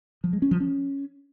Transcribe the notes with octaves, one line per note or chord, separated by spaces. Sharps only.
F3
G#3
C#4
F3
C#4